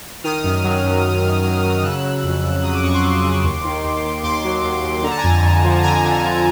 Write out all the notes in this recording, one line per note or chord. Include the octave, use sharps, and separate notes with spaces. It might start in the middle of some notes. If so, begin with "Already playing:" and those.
D#3 D#6 F6
F#2
F#3
F#2
F#3
F#2
F#3
F#3
C#3 E6 F#6
F#3
F2
F2
F#3 D#6
D6
F2 C#6
C6 D6
C#3
C#3
D#2
D#3
D#2
D#3
D#2 C6 D6
F#3
D#2
D#2
D3 A#5
A5
G#5 A#5
F2
F2
F3
D3 G#5 A#5
D3
F2